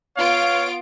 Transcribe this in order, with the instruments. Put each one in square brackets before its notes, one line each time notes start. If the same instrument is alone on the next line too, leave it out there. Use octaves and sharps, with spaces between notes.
[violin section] B3 F4 D7 [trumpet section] C#5 F5